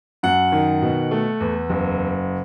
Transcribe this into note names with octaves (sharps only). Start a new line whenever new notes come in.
F#2 F#5
D#3
B2
A3
E2
F#1